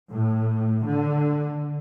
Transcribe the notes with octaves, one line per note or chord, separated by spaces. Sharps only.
A2
D3